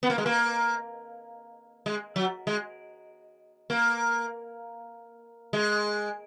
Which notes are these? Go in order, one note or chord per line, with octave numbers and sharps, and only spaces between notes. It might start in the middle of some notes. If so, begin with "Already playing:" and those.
B3
A#3
G#3
A#3
G#3
F#3
G#3
A#3
G#3